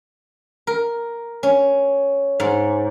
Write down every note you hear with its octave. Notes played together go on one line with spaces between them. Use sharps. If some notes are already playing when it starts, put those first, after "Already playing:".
A#4
C#4
G#2